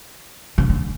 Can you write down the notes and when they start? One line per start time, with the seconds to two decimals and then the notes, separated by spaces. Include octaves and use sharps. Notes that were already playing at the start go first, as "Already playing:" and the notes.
0.58 C#3
0.69 D3